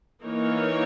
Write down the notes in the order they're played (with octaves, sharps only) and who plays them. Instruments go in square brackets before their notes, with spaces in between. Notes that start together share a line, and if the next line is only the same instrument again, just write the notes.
[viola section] E3 A#3 D#4 A#4 C#5